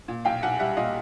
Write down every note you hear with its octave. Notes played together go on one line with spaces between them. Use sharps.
A#2
B1 F5 G5
B1 F#5 G#5
G3 E5 F#5
A#2 D#5 F5